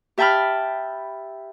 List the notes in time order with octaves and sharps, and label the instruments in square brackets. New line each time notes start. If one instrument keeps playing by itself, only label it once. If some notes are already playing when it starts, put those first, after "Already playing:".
[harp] G4 E5 G5 A5 B5 F6